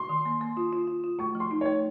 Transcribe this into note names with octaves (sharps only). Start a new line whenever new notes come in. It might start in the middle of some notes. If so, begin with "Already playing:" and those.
Already playing: C6
D#3
A#3
A#3
F4
F4
F4
F4
A3 C#6
F3
C6
D#4
A3 C#5